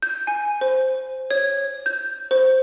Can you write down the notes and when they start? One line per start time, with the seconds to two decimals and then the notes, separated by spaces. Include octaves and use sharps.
0.02 G6
0.27 G#5
0.61 C5
1.31 C#5
1.86 G6
2.31 C5